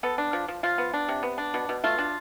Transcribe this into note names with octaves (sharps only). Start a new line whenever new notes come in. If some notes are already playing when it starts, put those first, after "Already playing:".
B3 A4
D4
F3
F3
F3 F4
B3
D4
C3
B3
D4
B2
B2
A3 F4
D4